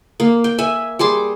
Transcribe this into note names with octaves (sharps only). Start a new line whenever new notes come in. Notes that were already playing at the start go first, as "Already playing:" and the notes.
A#3
G5
E5 G#5
G3 G#4 C6 D6